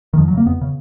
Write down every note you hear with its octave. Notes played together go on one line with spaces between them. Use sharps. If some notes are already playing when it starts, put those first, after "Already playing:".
D#3
F2 F3
F#3
C#3 A#3
F2 B3
C#3